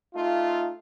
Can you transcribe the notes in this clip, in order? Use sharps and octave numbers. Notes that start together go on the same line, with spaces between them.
A3 D#4 F4